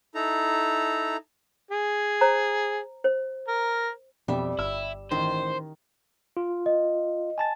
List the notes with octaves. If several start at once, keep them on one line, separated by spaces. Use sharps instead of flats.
D#4 E4 A4 A#5
G#4
C5 A#5
C5
A#4
F2 B2 G3 E5
G1 E4 E6
A1 D#3 C5
F4
D#5
G#5 A5 A6